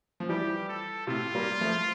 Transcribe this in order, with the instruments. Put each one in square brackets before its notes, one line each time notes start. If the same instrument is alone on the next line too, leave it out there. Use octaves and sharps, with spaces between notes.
[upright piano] F3
[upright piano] E3 G3 [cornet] G4
[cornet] A4
[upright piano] A2 C3 [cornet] F4
[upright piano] G3 A#3
F3 A3